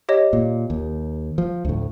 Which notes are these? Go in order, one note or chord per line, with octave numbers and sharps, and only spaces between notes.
G4 C#5 D#5
A#2
D#2
F3
D2 A2